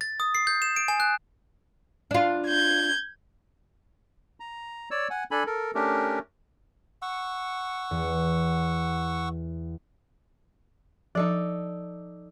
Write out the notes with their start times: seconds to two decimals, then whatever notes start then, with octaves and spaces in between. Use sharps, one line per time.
0.01 A6
0.20 D#6
0.35 C7
0.47 G6
0.62 E7
0.76 D7
0.88 G#5
1.00 F#6
2.11 D4 F4
2.47 G6 G#6
4.40 A#5
4.91 C#5 D5 E6
5.10 F#5 G#5
5.31 D4 A4 G#5 B5
5.46 A4 A#4
5.75 A3 C#4 D4 G4 A#4
7.02 F#5 C#6 E6
7.91 E2
11.15 F3 D#4 A4 D5